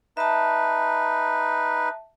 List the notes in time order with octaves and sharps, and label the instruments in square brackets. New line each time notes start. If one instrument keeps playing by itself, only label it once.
[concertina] D#4 B4 [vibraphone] E5 A5